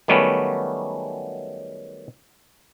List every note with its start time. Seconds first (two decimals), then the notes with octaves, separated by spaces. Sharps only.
0.08 D#3 F#3 G3 A3 B3 C#4